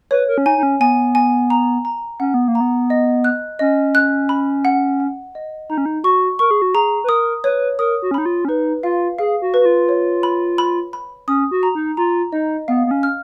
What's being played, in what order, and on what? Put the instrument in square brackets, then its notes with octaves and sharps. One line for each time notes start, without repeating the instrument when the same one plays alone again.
[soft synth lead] B4 [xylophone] C#5
[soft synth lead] A#4
C#4
[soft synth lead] D#4 [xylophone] G#5
[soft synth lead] D#4
C#4
[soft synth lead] B3 [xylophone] G#5
[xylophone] G#5
A#5
A#5
[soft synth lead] C#4 [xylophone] F#5
[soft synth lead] B3
A#3
[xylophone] A#5
[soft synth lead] B3
[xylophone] D#5
F#6
[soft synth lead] C#4 [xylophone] D#5
[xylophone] F#6
B5
F#5
F#5
D#5
[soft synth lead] D#4 [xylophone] A#5
[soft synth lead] C#4
D#4
[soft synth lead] F#4 [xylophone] C#6
[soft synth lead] A#4 [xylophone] C#6
[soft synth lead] G#4
F#4
[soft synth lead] G#4 [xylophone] A#5
[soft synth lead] B4
[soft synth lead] A#4 [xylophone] D#6
[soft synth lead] B4 [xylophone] C#5
[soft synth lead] A#4 [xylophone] D#6
[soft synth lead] F#4
C#4
[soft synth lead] D#4 [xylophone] B5
[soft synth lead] F4
C#4
[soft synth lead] D#4 [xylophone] B4
[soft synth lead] F4 [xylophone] F5
[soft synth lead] G#4 [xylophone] F5
[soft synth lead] F#4
[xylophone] B4
[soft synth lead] F#4
F4
[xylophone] C#5
B5
B5
B5
[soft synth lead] C#4 [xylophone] D#6
[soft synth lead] F#4
[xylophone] A#5
[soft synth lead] D#4
[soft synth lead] F4 [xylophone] A#5
[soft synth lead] D#4 [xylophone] D#5
[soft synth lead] B3 [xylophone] F5
[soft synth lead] B3
C#4
[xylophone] F6